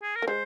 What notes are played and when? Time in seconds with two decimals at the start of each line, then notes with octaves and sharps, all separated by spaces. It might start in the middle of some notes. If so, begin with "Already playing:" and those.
0.02 G#4
0.16 A#4
0.22 A#3
0.27 G#3 C5